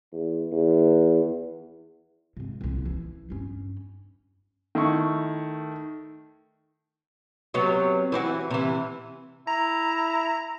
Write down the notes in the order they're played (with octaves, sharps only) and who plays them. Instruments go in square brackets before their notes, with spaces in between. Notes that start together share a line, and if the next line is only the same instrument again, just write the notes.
[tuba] E2
E2
[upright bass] G#2 C3
D#1 C2
E3
G2 C#4
[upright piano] D#3 A3 E4 C#6
[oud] C3 F#3 B3
E3 C4 F#4
C3 E3
[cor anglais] E4 [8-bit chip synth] A#5